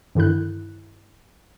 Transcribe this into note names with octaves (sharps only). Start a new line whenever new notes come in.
G2 D3 D#3 E4 F#6